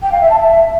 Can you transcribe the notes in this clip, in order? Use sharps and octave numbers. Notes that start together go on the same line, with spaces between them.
G5
F5
E5
A5
E5